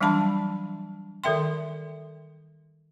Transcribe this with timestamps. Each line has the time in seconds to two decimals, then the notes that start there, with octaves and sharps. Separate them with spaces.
0.01 E3 F#3 G3 D4 A5 B5
1.24 D#3 A4 A#4 E5 G5 C6